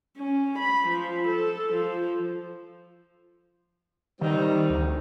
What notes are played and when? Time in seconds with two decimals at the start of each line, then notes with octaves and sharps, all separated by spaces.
0.17 C#4
0.58 B5
0.88 F3
1.28 A4
1.73 F3
4.21 D#3 G3 C4 D#4
4.70 D2